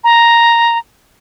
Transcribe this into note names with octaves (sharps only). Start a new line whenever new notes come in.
A#5